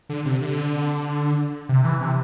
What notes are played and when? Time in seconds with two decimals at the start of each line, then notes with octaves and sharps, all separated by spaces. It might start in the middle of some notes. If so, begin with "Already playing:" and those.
0.09 D3
0.25 C3
0.42 D3
1.69 C3
1.84 E3
2.01 C3